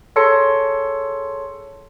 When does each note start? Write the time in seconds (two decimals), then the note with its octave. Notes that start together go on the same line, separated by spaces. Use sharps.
0.16 G#4 A4 C#5 A5 C6 C#7